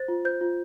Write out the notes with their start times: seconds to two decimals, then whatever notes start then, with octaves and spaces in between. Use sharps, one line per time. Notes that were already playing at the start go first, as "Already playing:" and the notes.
Already playing: C5 A6
0.08 F4
0.25 C5 G6
0.41 F4